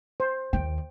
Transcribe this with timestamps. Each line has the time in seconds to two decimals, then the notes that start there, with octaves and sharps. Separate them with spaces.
0.20 C5
0.53 D#2 G5